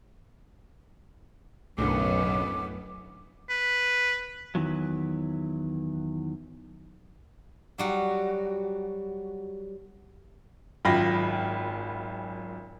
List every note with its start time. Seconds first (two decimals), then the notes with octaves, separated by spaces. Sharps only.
1.78 B1 F#2 A2 D3 B3 C#4 D6
3.50 B4
4.55 E2 D#3 E3 F#3
7.78 F#3 G3 F#4
10.85 G#1 F#2 F4 G5 B5 A#6